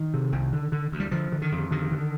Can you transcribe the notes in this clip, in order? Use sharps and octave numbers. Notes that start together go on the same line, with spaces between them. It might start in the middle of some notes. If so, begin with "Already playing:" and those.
Already playing: D#3
C3
C2
D3
D3
D2
G3
D3 F3
D3
D#3
F2
D3 D#3
D3